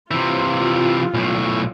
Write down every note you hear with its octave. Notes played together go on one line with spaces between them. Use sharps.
C3 E3 F4
B1 A2